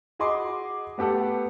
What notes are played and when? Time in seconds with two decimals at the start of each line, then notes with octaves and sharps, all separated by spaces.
0.19 F#4 G#4 D#5 B5 C6 D6
0.98 A3 B3 G4 A4 F#5